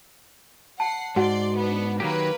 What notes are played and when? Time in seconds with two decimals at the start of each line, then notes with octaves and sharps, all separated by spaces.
0.80 F#5 A5 C7
1.16 G#2 F#4 D5 F#5 C6
1.57 B3 D4
2.00 D#3 F#3 A#3 G4 B4